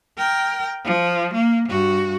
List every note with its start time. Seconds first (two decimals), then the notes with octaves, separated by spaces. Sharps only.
0.18 A#4 G5
0.84 F3
1.34 A#3
1.69 G2 F#4